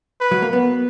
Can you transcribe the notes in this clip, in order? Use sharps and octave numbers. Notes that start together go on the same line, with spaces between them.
B4
F#3
A#3
B3